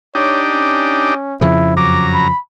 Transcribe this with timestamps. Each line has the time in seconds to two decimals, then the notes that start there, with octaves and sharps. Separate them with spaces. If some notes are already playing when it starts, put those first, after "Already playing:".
0.15 D4 D#4 G4 C#5
0.50 C#4
1.41 F2 C#3 F3 E4
1.77 F#2 A#5 D6
2.13 B5